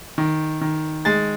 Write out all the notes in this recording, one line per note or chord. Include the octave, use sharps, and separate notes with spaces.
D#3
D#3
G#3 A6